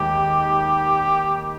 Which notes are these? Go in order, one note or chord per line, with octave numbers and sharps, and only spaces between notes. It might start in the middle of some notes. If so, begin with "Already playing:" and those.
Already playing: D#2 D#3 G#3 G4